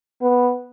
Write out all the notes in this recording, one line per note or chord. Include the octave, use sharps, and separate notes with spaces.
B3